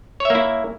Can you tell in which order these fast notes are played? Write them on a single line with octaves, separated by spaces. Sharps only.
C#5 E5 A#3 E4